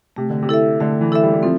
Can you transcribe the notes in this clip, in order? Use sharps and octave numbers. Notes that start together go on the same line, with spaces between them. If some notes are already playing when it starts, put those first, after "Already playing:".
C3 A3
D3
C3
E4 A4 E5
D3 A3
E3
E4 A4 E5
G3
G3
F3 C4